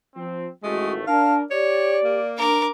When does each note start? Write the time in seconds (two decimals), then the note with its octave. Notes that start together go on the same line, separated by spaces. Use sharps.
0.15 F3 C4
0.63 A1 D#3 G#3 A3 F#4
1.07 D4 A#4 F5 A5
1.51 G4 C#5 D5
2.04 A#3
2.38 D4 A#4 D6